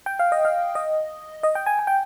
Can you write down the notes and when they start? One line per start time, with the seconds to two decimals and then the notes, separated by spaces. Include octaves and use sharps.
0.06 G5
0.19 F5
0.32 D#5
0.45 F5
0.75 D#5
1.43 D#5
1.55 G5
1.66 G#5
1.79 G#5
1.87 G5